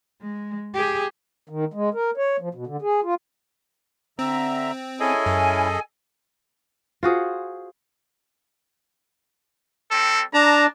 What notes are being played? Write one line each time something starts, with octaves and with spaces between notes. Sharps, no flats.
G#3
G4 G#4
D#3
G#3
A#4
C#5
F3
B2
D3
G#4
F4
D3 C4 E5 A#5
C#4 E4 G#4 A4 D#5 G#5
F#2
F4 F#4 G#4 C5
G3 C4 A4
D4 A5 A#5